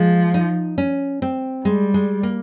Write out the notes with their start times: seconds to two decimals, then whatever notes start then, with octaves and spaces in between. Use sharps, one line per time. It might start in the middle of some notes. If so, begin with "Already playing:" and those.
Already playing: F3 G#3
0.34 D#4
0.78 C#4
1.22 C4
1.65 G3 G#3
1.94 G#3
2.23 A#3